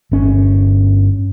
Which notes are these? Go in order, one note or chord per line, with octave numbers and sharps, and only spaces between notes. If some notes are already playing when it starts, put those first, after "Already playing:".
G1 C#4